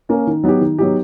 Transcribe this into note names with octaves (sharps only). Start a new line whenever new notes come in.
A#3 C#4
D#3
F#3 B3 D#4 G4
D#3
F#3 B3 D#4 G4